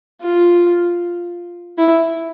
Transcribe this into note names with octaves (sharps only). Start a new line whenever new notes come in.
F4
E4